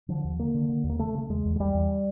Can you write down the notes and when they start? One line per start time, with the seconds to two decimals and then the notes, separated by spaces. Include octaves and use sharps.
0.09 D3 F3
0.24 D#2
0.39 D3 A#3
0.54 D3
0.69 D3
0.84 D#2
0.89 A#3
0.99 C#3 A3
1.15 C#3 A3
1.30 E2 G#3
1.45 E2
1.56 G#3
1.60 E2 G3
1.74 E2